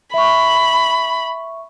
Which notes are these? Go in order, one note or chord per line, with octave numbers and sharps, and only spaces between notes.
E5 B5 C#6